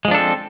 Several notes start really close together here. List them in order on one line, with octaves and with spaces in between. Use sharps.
G#3 F3 D4 A4 C4